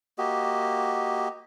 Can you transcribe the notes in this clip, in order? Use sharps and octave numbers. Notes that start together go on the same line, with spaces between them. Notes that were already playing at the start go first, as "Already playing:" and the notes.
A#3 F#4 G4 D#5